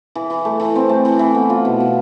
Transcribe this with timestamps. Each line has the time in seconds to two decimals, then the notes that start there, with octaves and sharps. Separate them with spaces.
0.15 E3
0.30 E3
0.45 A3
0.60 E3
0.76 C4
0.89 A3
1.05 E3
1.19 E3
1.35 B3
1.50 F4
1.65 B2
1.80 B2